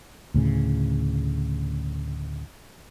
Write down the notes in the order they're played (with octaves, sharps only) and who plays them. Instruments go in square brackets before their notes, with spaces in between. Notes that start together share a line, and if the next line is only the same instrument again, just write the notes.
[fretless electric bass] D2 A2 C#3